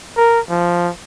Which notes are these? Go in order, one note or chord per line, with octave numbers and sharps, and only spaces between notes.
A#4
F3